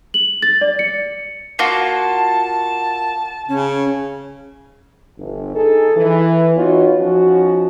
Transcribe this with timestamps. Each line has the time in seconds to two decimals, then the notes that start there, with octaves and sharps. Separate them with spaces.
0.14 F#7
0.42 A6
0.61 D5
0.79 C#7
1.59 A#3 F4 F#4 A5
3.49 C#3 C#4
5.17 G1
5.55 D#4 G#4 A4
5.96 E3
6.56 B3 D#4 F4 F#4 C#5
6.98 F3 C#4 D#4 F#4